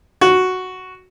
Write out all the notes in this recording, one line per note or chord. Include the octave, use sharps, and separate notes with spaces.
F#4